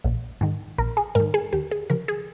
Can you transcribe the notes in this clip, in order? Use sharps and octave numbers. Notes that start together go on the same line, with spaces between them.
A#1
G#2 D#3
A#1 A#4
G#4
G#2 D#3 A#4
G#4
D#2 G4
G#4
C#3 F3 A#4
G#4